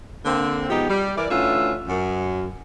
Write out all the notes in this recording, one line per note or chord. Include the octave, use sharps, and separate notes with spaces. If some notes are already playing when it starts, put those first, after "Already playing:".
D3 A#3 C4
B2 F3 G#3 B3 D#4 G4
G3
E3 E4 A#4 D5
D2 D3 E3 C#4 F4 E5
F#2